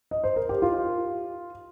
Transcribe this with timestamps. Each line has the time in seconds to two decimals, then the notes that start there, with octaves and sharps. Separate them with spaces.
0.11 D#5
0.24 C5
0.36 A#4
0.49 G4
0.62 F4